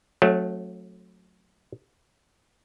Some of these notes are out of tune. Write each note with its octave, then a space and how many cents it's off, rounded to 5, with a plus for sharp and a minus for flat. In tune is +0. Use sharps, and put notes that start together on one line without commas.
F#3 -20 A3 -5 C4 +45